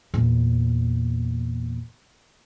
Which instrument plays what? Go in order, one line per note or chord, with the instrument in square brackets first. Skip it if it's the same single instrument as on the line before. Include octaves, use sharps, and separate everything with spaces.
[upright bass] E2 A#2